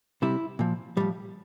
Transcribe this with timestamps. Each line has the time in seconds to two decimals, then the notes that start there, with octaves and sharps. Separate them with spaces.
0.22 C3 G3 E4
0.59 A#2 F3
0.97 A2 F3 G3